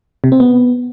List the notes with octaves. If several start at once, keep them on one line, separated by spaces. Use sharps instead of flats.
C3
C4
B3